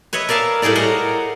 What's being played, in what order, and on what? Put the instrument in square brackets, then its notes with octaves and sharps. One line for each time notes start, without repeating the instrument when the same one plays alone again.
[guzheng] B4 C#5 D#5 E5
A#4 D5 E5 F5 A5
A2 G3 G#4 A#4 D5
F#4 A#4 D#5 F5 F#5